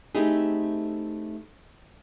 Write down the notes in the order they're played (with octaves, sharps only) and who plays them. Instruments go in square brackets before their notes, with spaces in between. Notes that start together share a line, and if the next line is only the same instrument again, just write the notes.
[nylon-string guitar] A3 C4 D#4 E4 G4 G#4